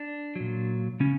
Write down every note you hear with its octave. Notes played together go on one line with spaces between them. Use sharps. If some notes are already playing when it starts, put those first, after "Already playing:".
Already playing: D4
A#2 F#3
C#3 C#4